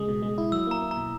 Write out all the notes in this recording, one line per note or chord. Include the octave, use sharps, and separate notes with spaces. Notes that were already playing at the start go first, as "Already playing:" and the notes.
Already playing: C#3 G#3 D#6
B2
G#3
E4
F#3 E6
A#3 A#5
A#3
A#5
B2